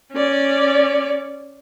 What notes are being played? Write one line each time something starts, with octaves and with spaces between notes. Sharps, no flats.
C#4 D5